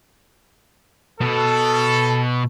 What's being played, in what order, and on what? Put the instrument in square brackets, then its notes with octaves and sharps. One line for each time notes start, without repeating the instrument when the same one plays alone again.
[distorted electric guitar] B2 [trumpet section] A4